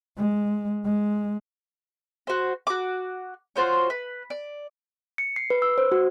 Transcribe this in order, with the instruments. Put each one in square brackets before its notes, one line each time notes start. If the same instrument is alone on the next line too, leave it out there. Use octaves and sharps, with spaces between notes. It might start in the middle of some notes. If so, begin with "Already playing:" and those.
[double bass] G#3
G#3
[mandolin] F#4 C5
F#4 D6
F4 F#4 C5 C#5
B4
D5
[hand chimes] C#7
C7
B4
E6
C5
F#4